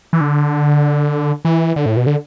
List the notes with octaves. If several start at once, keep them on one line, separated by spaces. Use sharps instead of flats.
E3
D3
E3
D3
A2
B2
D3